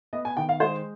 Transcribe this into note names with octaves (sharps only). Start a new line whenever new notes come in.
B3 D#5
G#5
D#3 G5
F5
G#3 C5